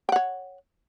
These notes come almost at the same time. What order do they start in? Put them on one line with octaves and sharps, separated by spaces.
G5 F#5 C#5